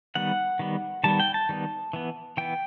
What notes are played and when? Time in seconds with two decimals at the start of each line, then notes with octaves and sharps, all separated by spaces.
0.15 D#3 G3 B3 F#5
0.59 D#3 G3 B3
1.04 D#3 G3 B3 A5
1.20 G5
1.34 A5
1.49 D#3 G3 B3
1.93 E3 B3
2.37 E3 B3 G5